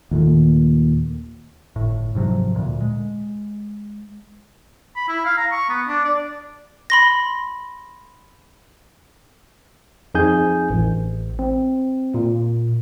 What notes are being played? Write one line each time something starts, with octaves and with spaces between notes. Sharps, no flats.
D#2 A#2 A3
G1 A2
G#2 C3 F3 F#3
D2 A#2
G#3
B5
E4
F5
A#5
C#6
B3
D4
D5
B5 C6 A#6
F2 D#4 G#4 G#5 G6
A1
C4
A#2